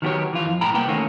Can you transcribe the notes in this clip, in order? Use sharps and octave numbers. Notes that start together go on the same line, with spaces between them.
D#3 F#3 B3 F4 G4 C#5
E3 F4
F2
B1 A2 G5 A#5 B5
C2 A#3 B3 G5
D#3 E3 A3 A#3 C#4